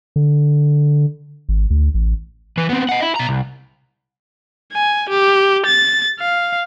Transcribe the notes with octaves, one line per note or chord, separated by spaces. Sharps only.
D3
G#1
D2
A1
E3 B4
B3 C4
D#5 F#5
E4
B2 A#5
C2
G#5
G4
A6
F5